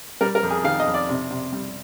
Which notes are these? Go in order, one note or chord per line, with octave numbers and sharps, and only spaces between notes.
G3 A#4
A#4
F2
G#4
D#3 F5
D#5
F2
D5
C3
C3
G3